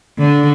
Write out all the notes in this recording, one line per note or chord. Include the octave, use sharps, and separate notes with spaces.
D3